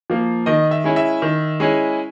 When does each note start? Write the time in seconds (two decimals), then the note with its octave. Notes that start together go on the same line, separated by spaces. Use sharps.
0.10 F3 A#3
0.46 D#3 D#5
0.71 E5
0.84 G#3 C#4 E4
0.96 E5
1.22 D#3
1.60 G#3 C#4 E4